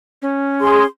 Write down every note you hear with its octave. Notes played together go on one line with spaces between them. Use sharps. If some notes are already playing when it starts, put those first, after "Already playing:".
C#4
G#4 C6